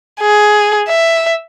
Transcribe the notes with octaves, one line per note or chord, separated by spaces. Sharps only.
G#4
E5